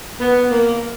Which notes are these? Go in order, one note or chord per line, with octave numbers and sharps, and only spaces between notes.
B3
A#3